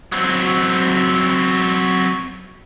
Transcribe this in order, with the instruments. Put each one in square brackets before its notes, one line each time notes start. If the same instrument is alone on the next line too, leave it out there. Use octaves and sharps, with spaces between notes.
[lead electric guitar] F#3 C4